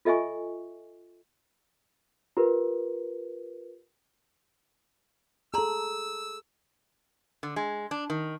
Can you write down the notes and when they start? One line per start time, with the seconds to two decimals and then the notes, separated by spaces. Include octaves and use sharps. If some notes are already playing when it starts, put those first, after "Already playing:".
0.05 F4 A4 D#5 E5 G#5 C#6
2.37 F4 G4 A#4 B4
5.54 G#4 A4 A5 A#5 C6 E6
7.43 D3
7.56 G#3
7.91 D4
8.10 D#3